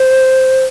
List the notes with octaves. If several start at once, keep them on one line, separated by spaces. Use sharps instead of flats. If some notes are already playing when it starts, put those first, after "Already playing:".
Already playing: C5